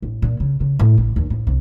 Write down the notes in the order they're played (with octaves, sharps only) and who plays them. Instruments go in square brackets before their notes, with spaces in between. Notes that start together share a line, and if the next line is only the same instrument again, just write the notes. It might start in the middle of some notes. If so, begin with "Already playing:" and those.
[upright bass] A1
A#2
C#3
C#3
A2
A1
D#2
A1
C2